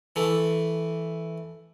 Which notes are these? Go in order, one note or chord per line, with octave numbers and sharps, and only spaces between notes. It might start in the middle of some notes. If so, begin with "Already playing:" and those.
E3 A3